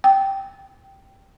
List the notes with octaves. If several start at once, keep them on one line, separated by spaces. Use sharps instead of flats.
G5